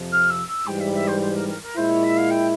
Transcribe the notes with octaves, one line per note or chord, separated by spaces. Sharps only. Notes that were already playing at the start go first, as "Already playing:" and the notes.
Already playing: F2 C3 F3
F6
E6
E6
G#2 E3 G3 G5
E5
E5
C5
C5
A#4
A#4
A#4
A#2 G#3 E4 C5
C#5
E5
F5
G5